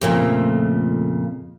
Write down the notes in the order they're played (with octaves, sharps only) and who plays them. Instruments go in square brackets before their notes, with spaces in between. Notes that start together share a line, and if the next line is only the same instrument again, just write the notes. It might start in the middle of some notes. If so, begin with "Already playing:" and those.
[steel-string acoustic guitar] F2 A#2 C#3 [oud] A3 A#3 G4